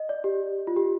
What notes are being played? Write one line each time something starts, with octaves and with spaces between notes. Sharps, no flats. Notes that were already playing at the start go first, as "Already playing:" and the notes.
Already playing: D#5
D5
G4
F4
G4